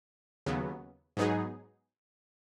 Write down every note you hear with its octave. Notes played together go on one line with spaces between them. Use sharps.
D#2 C#3 F#3 B3
G#2 F#3 B3 D#4 G#4